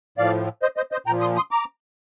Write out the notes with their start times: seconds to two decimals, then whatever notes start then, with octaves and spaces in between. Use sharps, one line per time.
0.18 A2 F3 D5 F5
0.62 C5 D#5
0.77 C5 D#5
0.92 C5 D#5
1.07 A#2 G5 A#5
1.11 F3
1.21 C6 D#6
1.36 C6 D#6
1.51 A#5 D6